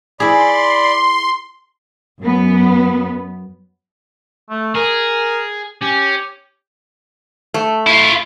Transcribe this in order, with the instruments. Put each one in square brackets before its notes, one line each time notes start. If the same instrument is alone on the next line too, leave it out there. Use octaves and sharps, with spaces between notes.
[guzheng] E4 G#4 [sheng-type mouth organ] D5 B5 [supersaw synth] C6
[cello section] F#2 B3
[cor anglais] A3
[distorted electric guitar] G#4 [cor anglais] A#4
[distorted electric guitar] C#4 [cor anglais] G4
[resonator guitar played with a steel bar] A3
[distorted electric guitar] E4 F4